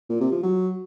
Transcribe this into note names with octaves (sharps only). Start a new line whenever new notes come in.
A#2
C3
F3
F#3